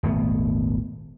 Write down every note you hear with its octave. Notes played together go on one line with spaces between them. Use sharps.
D#1 G#1 A3 B3